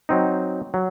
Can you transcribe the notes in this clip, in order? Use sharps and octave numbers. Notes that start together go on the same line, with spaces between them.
F#3 C4 D#4
F#3